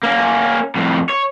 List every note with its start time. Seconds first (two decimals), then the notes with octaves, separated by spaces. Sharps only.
0.03 A#3 C#4
0.76 F2 A2
1.10 C#5